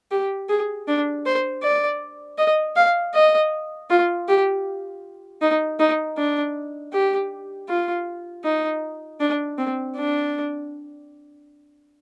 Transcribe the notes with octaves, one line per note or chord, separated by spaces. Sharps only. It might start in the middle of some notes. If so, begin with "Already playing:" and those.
G4
G#4
D4
C5
D5
D#5
F5
D#5
F4
G4
D#4
D#4
D4
G4
F4
D#4
D4
C4
D4